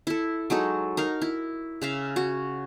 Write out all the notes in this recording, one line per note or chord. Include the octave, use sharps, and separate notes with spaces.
E4 A4
F#3 G#3 D#4 A4
D#4 A#4 F5
E4
C#3 E5 F5
F#4